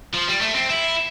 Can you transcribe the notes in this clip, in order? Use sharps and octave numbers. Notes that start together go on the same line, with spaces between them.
F3
G3
A3
C4
E4